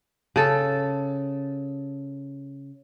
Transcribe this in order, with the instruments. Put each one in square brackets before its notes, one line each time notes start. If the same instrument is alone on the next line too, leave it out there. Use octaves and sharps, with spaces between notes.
[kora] C#3 A4